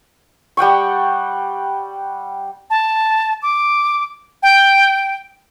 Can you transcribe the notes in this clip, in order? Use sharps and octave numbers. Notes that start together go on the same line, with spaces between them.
G3 F#5 G5 C#6
A5
D6
G5